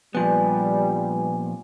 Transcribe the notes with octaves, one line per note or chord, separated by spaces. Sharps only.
A#2 F3 G3 B3 B4 G#5